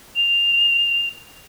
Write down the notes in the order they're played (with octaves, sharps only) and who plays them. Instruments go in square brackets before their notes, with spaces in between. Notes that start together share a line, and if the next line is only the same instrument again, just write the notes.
[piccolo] F7